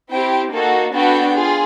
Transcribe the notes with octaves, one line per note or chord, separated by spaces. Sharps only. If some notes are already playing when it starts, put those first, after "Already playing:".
C4 E4 G4 G5
A#3 D#4 F#4 A4
B3 D4 F#4 A4 G5
F4 G#4